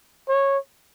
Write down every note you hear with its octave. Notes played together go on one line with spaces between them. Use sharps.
C#5